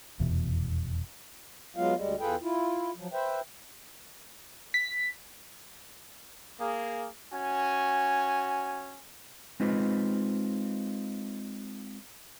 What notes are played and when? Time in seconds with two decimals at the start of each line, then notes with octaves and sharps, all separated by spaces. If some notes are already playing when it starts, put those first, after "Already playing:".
0.20 F1 E2 B2
1.76 F#3 G#3 B3 F4 F5
1.95 D2 G3 G#3
2.20 E2 F4 G#4 A4 B4 G5
2.42 E4 F4
2.97 F3 F#3
3.13 B4 C5 E5 G5
4.74 B6
6.59 A#3 G#4
7.32 C#4 F#4 G#5
9.60 G#3 C4 D#4 F4 B4